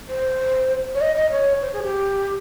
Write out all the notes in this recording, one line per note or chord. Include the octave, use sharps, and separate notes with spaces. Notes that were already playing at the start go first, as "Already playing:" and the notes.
C5
C#5
D#5
D#5
C#5
C5
G#4
G4